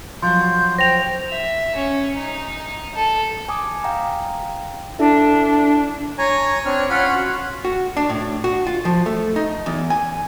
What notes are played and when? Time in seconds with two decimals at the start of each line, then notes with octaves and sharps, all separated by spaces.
0.22 F3 F#3 C6 G6
0.79 C5 G5 A#6 F7
1.29 E5
1.76 C#4
2.18 D#4
2.95 A4
3.49 G#5 D6 D#6
3.84 F5 G5 A#5
4.99 D4 E4 A4 E5
6.18 C#5 G#5 A#5
6.66 C4 D4 C#5 F6
6.90 C#4 F4 F#5 B5 F6
7.15 F#4
7.65 F#4
7.97 D4
8.09 A2
8.44 F#4
8.67 F4
8.85 F3
9.06 A3
9.36 D#4
9.66 E2
9.90 G#5